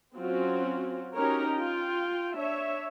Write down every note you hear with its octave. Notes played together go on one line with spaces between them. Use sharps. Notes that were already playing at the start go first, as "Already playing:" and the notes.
F#3 C4 C#4 F4 F#4
C#4 D#4 F#4 G4 A#4 C#5
F4 G5
D4 C#5 E5